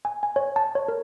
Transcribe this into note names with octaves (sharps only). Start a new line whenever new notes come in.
G#5
G#5
C#5
A5
C#5
A#4